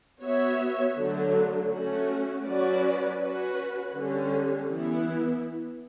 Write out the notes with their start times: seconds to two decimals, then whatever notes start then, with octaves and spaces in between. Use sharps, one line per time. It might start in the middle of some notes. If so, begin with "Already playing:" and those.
0.21 B3 F#4 C#5 E5
0.96 D3 F#3 A3
1.70 A3 C#4 F#4
2.45 F#3 C#4 F#4 B4 D5
3.20 C#4 F#4 B4
3.94 D3 G3 C#4
4.68 E3 B3 E4